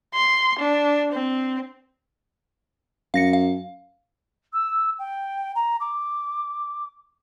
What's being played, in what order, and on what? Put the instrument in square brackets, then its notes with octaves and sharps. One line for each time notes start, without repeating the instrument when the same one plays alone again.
[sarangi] C6
D4
C4
[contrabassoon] F#2 [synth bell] F5 A#6 C#7
[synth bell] F5
[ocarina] E6
G5
A#5
D6